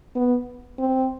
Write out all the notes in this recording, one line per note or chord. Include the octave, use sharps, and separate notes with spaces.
B3
C4